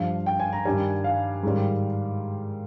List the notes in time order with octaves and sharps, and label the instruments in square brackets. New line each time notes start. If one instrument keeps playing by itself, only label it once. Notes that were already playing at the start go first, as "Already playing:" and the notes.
Already playing: [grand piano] G2 F3 F5
G5
G#5
A#5
G2 D#3 G3 G#5
F5
G#2 D#3 G3